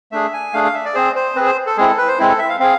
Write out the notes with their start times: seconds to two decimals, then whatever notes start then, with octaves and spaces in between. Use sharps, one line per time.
0.12 A3 D4 G#4 E5
0.33 G#5
0.53 A3 D4 G#4 F5
0.64 F5
0.74 E5
0.85 D5
0.94 C4 G#4 C5
1.16 C5
1.36 C4 G#4 B4
1.46 C5
1.66 A4
1.77 G#3 C4 E4 G#4
1.87 A4
1.98 B4
2.08 C5
2.18 G#3 C4 E4
2.29 A4
2.39 E5
2.49 F5
2.60 C4 G#4 F5